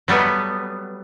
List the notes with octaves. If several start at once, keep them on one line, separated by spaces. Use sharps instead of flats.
F#3 G3 A3 B3